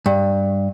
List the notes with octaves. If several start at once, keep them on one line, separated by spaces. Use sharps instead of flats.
G2